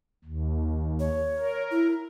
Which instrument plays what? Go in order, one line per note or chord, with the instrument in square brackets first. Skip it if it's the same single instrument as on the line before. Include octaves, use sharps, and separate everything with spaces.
[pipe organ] D#2
[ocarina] C#5
[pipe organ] A#4
[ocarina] E4